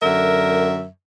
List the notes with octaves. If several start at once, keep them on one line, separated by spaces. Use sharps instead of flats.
F#2 D3 A#4 E5